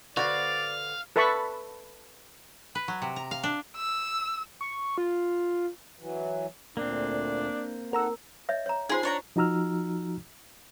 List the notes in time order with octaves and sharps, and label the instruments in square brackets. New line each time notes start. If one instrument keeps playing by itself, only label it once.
[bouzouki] D3 B3 C5 [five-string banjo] F#4 [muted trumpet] D5 [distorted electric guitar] F5
[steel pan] A4 B4 E5 A5 B5 C#6
[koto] B4
F#3
C3
A#5
F5
D4
[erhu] E6
[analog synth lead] C#6
F4
[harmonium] E3 F#3
[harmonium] D2 A#2 [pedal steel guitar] A#3 C4 [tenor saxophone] D4
[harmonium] D#4 A4 F#5 [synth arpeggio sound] A#4 A#5 E6
[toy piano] C#5 D#5 E5
C#5 A#5
[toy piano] D#4 F4 C5 [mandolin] G#4 C6
[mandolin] D4 C#5 A#5
[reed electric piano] F3 D#4 F#4 A#5 E6 F6